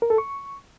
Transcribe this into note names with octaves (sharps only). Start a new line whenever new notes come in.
A#4
A4
C#6